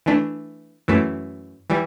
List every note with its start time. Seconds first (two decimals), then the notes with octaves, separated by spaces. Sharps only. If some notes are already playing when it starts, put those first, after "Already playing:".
0.06 E3 A3 D4
0.88 F#2 E3 A3
1.70 E3 G3